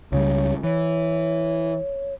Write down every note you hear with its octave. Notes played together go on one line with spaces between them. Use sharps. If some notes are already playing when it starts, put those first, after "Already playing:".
C#2 C#3 G3 C#5
E3 C#5